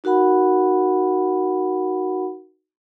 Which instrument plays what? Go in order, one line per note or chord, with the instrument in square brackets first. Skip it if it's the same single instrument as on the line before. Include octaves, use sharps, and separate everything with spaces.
[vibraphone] D#4 F#4 A#4 F#5 B5